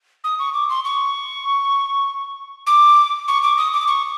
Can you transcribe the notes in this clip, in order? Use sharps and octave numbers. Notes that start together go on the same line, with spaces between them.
D#6
C#6
D6
C6
C#6
D6
C#6
D6
D#6
D6
C#6